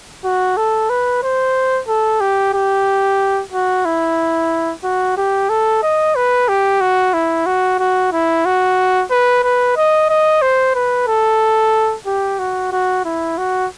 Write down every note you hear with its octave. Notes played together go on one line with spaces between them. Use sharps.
F#4
A4
B4
C5
A4
G4
G4
F#4
E4
F#4
G4
A4
D#5
B4
G4
F#4
E4
F#4
F#4
E4
F#4
B4
B4
D#5
D#5
C5
B4
A4
G4
F#4
F#4
E4
F#4